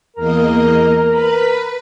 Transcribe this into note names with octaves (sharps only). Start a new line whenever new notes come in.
E2 A#3 A#4 D#5
B4 B5